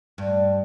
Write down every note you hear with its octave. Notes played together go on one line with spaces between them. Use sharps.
G2